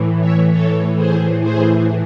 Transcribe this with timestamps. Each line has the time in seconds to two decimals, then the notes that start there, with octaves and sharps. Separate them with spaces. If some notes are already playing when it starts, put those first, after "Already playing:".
Already playing: A2 E3
0.21 C#5 E5
0.52 A2 E3 A4 C#5
0.97 G#4 C5
1.43 G#4 C5